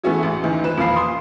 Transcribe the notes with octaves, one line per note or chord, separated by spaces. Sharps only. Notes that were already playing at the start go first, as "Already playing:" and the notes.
E3 A3 B3 C#4 F#4 G#4
A1
D2 D#3 E3
F3 B4 E7
E1 A#2 F3 F5 B5 C7
C6 D#6